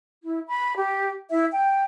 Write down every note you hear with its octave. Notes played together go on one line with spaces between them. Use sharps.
E4
B5
G4
E4 E5
G5